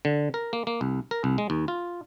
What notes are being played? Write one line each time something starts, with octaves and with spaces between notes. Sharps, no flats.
D3
A#4
A#3
A#3
C2
A#4
C2
G#3
D#2
F4